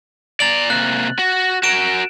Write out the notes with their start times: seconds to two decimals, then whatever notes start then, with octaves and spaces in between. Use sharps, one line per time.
0.40 D5 A#5 A6 F#7
0.70 C3 A#3 F#6
1.19 F#4
1.63 F#4 A#4 D7 E7